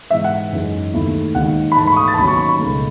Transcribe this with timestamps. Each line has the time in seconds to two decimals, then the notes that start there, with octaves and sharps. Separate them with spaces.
0.10 G#2 E3 G#3 E5
0.24 F#5
0.53 F#2 E3 G#3 D#4
0.94 D#2 D#3 A3 E4
1.35 D#2 D#3 G#3 F#5
1.72 B5
1.77 G#2 E3 A3 A5
1.87 B5 C#6
1.97 D#6
2.08 A6
2.14 A5
2.18 D#2 D#3 F#3 C#4 B5
2.28 C#6
2.38 C#6
2.49 B5
2.59 C#2 B2 A3